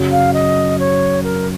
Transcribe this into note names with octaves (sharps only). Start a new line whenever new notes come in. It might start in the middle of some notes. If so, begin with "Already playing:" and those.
Already playing: F#2 C#3 F#3
F5
D#5
C#5
A#4